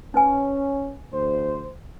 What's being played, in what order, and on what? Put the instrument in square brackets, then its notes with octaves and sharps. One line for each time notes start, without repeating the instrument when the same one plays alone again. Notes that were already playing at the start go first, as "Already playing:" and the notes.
[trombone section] C#4 [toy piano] D#4 B4 G#5
[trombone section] D2 C5